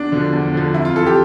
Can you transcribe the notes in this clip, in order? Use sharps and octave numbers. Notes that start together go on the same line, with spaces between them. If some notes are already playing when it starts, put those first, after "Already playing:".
Already playing: E2 D4
D3 F3
E2
D3 F3
F2 E4
F4
E3 A4
G4